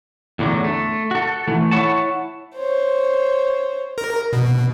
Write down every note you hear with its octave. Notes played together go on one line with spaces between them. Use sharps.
E2 A2 D3 F#3
A3
F#4 A4
E3 A3
E4 C#5 F#5 A5
C5 C#5
A#4
B2